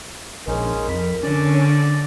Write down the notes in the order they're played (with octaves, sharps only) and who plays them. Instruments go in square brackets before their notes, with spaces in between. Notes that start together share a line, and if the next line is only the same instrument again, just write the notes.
[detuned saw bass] A#1 [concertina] G#3 C#4 D#4 [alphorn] A#4
[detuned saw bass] F2 [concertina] B5
[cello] D3 [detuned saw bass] C#4 [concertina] D5